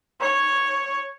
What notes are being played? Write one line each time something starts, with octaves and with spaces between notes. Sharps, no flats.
C#5